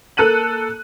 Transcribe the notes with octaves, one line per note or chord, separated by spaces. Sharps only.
A#3 A4 F#6 D#7 F#7